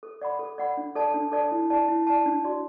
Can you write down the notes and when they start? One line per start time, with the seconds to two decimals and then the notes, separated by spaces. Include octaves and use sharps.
0.03 A4
0.22 D5 F#5 B5
0.39 A4
0.58 D5 F#5 B5
0.77 D4
0.96 A4 D5 A5
1.14 D4
1.32 A4 D5 A5
1.52 E4
1.70 D5 A5
1.88 E4
2.07 D5 A5
2.26 D4
2.44 F#4 D5